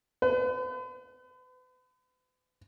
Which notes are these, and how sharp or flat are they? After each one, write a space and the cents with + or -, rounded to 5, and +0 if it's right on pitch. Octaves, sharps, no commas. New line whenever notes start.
B4 +40